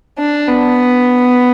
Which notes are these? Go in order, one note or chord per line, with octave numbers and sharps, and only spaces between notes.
D4
B3